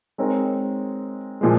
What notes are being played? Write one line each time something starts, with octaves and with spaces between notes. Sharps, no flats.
G#3 C4 D#4 A#4 C#5
A#2 F3 G#3